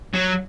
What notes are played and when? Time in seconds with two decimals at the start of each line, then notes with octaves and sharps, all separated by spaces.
0.14 F#3